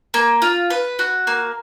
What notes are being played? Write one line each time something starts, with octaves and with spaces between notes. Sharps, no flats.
A#3
F4
B4
F#4
A#3